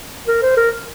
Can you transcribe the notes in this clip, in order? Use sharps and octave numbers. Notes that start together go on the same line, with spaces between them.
A#4
C5
A#4